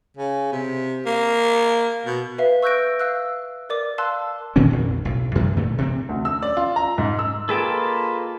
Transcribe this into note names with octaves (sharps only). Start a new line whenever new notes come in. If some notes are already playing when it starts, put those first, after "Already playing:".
C#3
C3
A#3
B2
B4 E5 F5
C#6 E6 F#6 G6 A#6 D7
F5 E6 F#6
A#4 D5 D6
F5 A5 C6 E6 F#6
A#2 D#3 C4 C#4
A#1 F2
B1 A2
F#2 C3 E3 G3
G2 A#2 D3 A3
C3 E3 C4
D2
E6
D5
F4
A#5
G#2
E6
A#3 F4 G#4 A4 B4 D#5 G5 A5